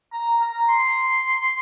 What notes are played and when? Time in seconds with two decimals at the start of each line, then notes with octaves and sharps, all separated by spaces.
0.13 A#5
0.41 A#5
0.69 C6